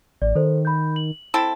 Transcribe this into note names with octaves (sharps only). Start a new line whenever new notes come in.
A1 D5
D#3 A4 C5
B5 G6
F#7
C4 E4 A4